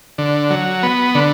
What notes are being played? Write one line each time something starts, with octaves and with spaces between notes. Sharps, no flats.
D3
F#3
B3
D3